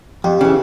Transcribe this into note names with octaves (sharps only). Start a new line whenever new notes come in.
F2 G4
C#3 E3